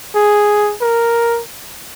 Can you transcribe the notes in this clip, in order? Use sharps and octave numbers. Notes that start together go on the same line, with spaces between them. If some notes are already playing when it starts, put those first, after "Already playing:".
G#4
A#4